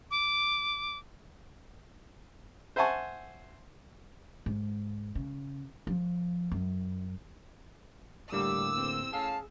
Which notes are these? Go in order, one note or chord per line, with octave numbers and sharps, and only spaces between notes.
D6
C5 E5 F#5 G#5 A5 C#6
G#2
C#3
F3
F#2
A2 D3 G3 A#3 D6 E6
E2 C4
A2 C#4 G#4 F5 A5